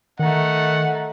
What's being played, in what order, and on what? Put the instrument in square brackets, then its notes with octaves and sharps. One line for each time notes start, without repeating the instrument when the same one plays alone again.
[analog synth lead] D#3 [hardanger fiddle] A3 D#4 [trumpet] F#5